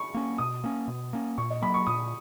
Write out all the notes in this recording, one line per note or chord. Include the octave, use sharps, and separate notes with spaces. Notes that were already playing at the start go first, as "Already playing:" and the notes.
Already playing: B5 C#6
A#3 C#4
B2 D#6
A#3 C#4
B2
A#3 C#4
A#2 C#6
D#5
F#3 A#3 B5
C#6
A#2 D#6